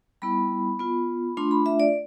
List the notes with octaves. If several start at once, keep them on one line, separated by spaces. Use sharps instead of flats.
G3 B3 E4 B5
B3 F4
A3 D4 F4 C6
B5
E5
D5